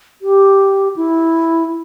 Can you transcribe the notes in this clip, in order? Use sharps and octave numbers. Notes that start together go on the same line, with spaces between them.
G4
E4